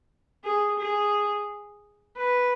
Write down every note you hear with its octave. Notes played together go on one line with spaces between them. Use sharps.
G#4
G#4
B4